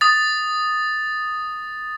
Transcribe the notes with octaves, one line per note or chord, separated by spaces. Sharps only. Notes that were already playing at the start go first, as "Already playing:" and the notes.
D#6 A6